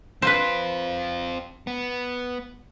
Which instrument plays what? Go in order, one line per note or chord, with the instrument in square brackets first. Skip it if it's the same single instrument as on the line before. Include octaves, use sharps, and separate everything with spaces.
[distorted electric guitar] C4 F4 [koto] B4 C5
[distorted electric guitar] B3